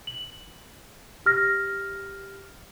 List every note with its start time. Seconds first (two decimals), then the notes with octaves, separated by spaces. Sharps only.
0.07 F#7
1.26 G4 F6 A#6